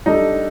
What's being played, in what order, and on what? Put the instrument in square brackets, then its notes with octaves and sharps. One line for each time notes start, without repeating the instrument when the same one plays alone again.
[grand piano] G3 D4 A4 [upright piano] D#4